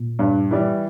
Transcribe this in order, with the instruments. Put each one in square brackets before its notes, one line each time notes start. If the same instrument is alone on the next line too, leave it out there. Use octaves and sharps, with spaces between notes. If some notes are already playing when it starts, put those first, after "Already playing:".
Already playing: [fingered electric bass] A#2
[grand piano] G2
E3 G3